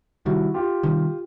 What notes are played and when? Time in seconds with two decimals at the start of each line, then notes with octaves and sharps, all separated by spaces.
0.25 C3 D#3 G3 E4 F#4
0.54 F4 G4
0.83 C3 D#3 G3